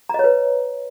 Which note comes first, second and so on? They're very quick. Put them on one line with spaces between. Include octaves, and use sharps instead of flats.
A#5 D#5 C#5 B4